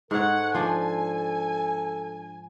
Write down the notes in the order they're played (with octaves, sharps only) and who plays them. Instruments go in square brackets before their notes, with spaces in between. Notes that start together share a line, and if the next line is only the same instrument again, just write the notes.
[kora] G#2 C#5 [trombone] A4 [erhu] F#5
[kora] F3 D4 [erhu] G#5